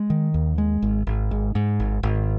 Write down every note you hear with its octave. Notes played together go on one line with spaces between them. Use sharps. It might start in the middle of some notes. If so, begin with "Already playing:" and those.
Already playing: G#3
D#3
D#2
G#3
G#1
G#1
G#2
G#2
G#1
G#1